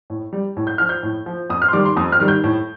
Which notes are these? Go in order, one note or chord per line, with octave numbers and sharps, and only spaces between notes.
A2
G3
A2
G6
F3 F6
G6
A2
F3
F2 D#6
F6
C6
D#3 G3 D6
C6
F2 D#6
F6
D#3 G3
G6
A2